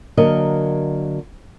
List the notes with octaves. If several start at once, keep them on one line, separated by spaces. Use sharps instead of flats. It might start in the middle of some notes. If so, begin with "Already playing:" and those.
D3 F#3 A#3 A#4 D#5